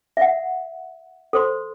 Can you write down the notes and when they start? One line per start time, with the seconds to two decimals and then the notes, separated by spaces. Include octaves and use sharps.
0.17 E5 F#5
1.33 A4 C5 C6